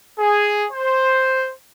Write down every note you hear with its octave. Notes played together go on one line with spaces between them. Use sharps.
G#4
C5